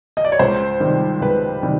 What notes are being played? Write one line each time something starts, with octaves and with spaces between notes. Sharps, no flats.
D#5
D5
C#5
C#2 C5
C3 D#3 G3
C#2 B4
C3 D#3 G3